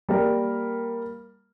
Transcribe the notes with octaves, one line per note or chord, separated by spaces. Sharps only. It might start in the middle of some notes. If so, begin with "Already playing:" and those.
G3 A#3 A#4